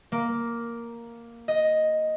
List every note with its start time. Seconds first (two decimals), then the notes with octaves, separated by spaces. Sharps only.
0.12 A#3
1.48 D#5